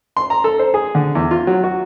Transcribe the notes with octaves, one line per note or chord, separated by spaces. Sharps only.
C6
A#5
A4
C5
G#4
D3
E2
F4
F#3
F#4